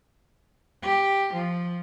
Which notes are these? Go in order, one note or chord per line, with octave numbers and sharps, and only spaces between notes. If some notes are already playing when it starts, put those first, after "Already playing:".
G4
F3